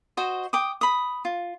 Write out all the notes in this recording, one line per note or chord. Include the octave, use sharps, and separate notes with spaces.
F#4 C5 D#5
G5 D6 D#6
B5 D#6
F4